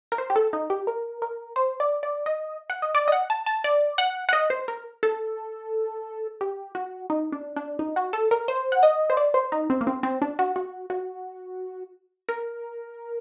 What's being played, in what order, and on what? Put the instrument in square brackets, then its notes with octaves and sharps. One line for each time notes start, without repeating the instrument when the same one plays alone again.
[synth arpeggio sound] A#4
C5
G4
A4
D#4
G4
A#4
A#4
C5
D5
D5
D#5
F#5
D#5
D5
D#5
F#5
A5
A5
D5
F#5
F#5
D#5
C5
A#4
A4
G4
F#4
D#4
D4
D4
D#4
F#4
A4
A#4
C5
F#5
D#5
C5
D5
C5
D#4
C4
A#3
C4
C4
D4
F#4
F#4
F#4
A#4